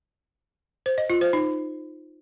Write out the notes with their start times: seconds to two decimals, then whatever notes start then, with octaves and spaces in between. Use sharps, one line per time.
0.86 C5
0.98 D#5
1.10 F4
1.21 C5
1.33 D#4